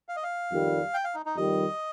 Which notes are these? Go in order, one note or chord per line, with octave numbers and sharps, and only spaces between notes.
F5
D#5
F5
F2 D#3 G3
G5
F5
D#4
D#4
F2 D#3 G3 D#5